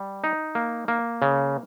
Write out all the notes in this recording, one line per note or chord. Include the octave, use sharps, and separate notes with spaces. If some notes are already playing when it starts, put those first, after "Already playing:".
Already playing: G3
D#4
A#3
A#3
C#3